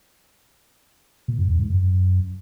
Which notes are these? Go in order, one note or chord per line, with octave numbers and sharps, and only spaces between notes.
A#2
F#2
E2
G#2
F#2